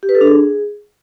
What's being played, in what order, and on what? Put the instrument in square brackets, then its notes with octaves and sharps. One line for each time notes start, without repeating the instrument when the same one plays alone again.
[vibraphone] G4
B4
A4
D4
G#4